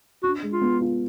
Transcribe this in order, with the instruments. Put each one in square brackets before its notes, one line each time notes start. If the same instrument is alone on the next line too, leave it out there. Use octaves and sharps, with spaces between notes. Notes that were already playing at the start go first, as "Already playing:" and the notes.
[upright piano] D4 [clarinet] F#4
[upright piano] G#3
[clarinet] F4
[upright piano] B3
F4